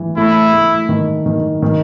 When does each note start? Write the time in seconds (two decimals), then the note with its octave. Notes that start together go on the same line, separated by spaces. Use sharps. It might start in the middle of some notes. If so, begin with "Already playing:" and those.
Already playing: E3
0.17 A3 E4
0.53 A3
0.89 D#3
1.26 D#3
1.62 D#3